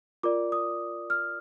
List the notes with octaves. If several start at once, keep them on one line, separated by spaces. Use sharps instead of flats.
F4 A#4 D5 D6
D#6
F6